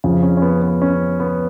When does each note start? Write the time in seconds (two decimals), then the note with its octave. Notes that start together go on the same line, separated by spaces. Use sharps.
0.04 F2 C#3 F3
0.23 C#4
0.37 C#4
0.42 B3
0.62 B3
0.82 C#4
1.20 B3